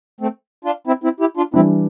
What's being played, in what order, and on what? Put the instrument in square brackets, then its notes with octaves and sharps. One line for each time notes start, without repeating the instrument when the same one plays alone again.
[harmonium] A3 C4
D4 F4
C4 E4
C4 E4
E4 G4
D4 F4
[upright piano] E3 G3 D4 [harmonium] C4 E4